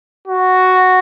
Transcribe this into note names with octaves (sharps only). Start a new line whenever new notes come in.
F#4